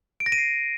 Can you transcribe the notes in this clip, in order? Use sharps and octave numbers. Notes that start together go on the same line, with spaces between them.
D7
A#6
D#7
C7